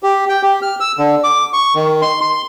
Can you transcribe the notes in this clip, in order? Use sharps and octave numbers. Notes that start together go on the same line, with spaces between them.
G4
G5
G4
F6
E6
D3
D6
C#6
D#3
C6
C6